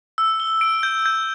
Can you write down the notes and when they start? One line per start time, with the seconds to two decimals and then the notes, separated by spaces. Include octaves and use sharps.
0.18 E6
0.40 G7
0.61 D7
0.83 G6
1.06 G6